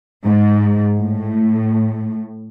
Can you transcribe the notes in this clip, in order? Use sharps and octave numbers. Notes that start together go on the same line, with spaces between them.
G#2
A2